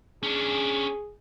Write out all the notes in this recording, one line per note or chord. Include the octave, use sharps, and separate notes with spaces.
C#4 D4 G#4